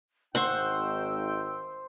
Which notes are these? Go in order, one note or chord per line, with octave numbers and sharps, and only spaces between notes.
G#1 D#4 C5 F#5 G5 C6 C#6 E6